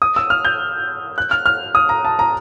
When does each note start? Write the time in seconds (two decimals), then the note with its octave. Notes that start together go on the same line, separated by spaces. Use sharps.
0.02 D#6
0.16 E6
0.30 F6
0.45 G6
1.18 F#6
1.31 F6
1.46 F6
1.75 D#6
1.89 A#5
2.05 A5
2.19 A#5